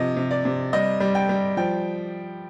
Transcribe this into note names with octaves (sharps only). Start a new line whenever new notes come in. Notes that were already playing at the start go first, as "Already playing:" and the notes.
Already playing: C3 F3 D#5
C3
D5
C3
G3 D#5
G3
G5
G3
F3 G5